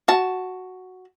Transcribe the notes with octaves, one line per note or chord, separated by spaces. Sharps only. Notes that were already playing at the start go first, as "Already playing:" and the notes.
F#4 A5